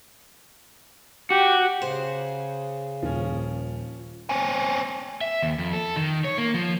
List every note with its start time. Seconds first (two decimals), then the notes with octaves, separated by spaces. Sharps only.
1.30 F#4 G4
1.82 C#3 G#4 C5
3.02 D#1 F3 C#4 G#5
4.30 C4 C#4
5.21 E5
5.42 D#2
5.58 F2
5.73 A4
5.96 D#3
6.24 C#5
6.38 A#3
6.54 F3